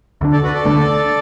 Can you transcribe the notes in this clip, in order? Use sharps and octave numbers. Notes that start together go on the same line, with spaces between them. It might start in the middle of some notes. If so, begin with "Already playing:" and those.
D2 D3 A3 D4
A4 D5
F#4 B4
A4 D5
D2 D3 A3 D4